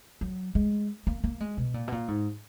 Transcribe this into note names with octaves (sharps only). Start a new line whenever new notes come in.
F#3
G#3
A#3
A#3
G#3
B2
A#2
B2
A#2
G#2